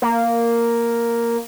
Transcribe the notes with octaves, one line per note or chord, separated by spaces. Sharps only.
A#3